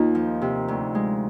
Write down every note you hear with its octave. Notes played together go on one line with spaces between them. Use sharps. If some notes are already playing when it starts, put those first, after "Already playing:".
Already playing: D#2 D#4 F4
F3
C3
D2
G#3